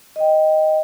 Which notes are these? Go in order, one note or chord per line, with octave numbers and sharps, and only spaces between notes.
D#5 G5